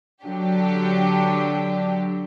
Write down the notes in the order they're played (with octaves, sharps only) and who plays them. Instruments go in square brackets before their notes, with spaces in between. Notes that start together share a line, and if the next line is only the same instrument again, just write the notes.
[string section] D3 F#3 D4 G4